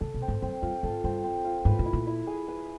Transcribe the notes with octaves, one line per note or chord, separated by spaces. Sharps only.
C#3 A4
B2
C4
G#2
F#2 C4
G2 F4
G#2 A4
G2 C4
C4
F4
G#2 B4
A2
E4
A#2
E4
G#4
B4